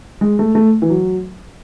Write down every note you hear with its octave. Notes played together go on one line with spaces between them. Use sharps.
G#3
A3
A3
E3
F#3